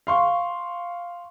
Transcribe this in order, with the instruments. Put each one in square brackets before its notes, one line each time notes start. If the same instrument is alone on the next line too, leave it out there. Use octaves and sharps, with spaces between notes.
[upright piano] F5 C6 C#6